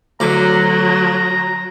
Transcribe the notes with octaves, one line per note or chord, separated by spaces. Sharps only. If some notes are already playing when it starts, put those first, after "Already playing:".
D2 F#3 A#5 D6